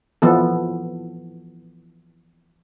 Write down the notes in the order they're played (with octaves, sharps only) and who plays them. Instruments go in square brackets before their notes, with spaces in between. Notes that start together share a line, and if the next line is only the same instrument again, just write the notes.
[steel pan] E3 F3 B3 A4